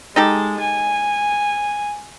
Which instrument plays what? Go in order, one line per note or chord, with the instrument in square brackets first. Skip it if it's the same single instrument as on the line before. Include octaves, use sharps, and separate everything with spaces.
[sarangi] G#3 [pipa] D#4 G4 A4
[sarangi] G#5